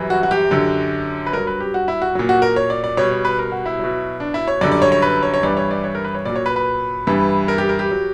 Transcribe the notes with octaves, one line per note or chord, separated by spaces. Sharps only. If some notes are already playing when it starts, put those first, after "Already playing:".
Already playing: F#2 E3 G3
F#4
F#4
G4
F#2 D3 F#3
B4
G2 F#3 A#4
B4
G4
F#4
E4
F#4
A#2 F#3
F#4
A#4
C#5
D5
D5
B2 G3 C#5
C#5
B4
A#4
F#4
E4
B2 F#3
D4
E4
C#5
F#2 D3 G3 D5
D5
C#5
C#5
B4
C#5
C#5
G2 E3 G3 D5
C#5
D5
C#5
A#4
B4
C#5
A#2 F#3 D5
C#5
B4
B4
G2 E3 G3
A#4
G4
A#4
G4
F#3